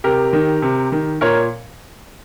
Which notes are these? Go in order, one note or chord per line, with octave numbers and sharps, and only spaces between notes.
C3 G4 A#4
D#3
C3
D#3
A#2 A#4 C#5